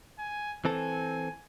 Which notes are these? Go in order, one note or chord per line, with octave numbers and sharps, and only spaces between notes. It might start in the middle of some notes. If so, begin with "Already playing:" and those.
G#5
E3 C4 A4 G#5